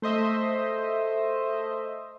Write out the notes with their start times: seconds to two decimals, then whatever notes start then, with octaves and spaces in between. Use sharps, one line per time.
0.02 A3 C5 D#5 E5